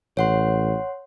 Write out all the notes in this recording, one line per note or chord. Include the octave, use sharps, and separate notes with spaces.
A1 C#5 F#5 C6